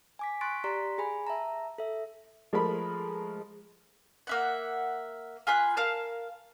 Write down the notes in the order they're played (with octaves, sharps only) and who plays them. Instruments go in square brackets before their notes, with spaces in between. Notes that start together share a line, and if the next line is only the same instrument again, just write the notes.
[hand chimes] G#5 D6 B6
C6 C#6 F#6 A6 B6 D7
G4 D5 A#5 C6 B6
G#4 G#5 B5
E5 A5 A#5
A4 E5
[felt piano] F3 G#3 A3 A#4 B5
[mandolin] A#3 E5 F#5
F4 G#4 B5 F#6
A#4 F5 A5